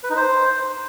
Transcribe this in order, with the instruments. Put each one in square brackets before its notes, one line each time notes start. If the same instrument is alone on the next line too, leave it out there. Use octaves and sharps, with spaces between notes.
[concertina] B4
D#4
C5